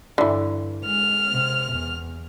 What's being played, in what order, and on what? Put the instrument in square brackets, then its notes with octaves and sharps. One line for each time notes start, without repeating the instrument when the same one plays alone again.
[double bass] G2 [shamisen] D3 E3
[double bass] G#3 [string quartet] F6
[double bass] C3
E2